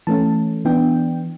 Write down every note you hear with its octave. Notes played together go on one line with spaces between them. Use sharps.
E3 A3 C#4 A5
E3 B3 D4 G5